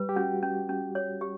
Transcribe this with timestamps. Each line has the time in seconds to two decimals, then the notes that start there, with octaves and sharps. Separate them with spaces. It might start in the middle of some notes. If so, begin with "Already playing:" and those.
Already playing: G3 B4
0.09 G4
0.16 C#4 F#4
0.43 C#4
0.69 C#4
0.95 C#5
1.21 G4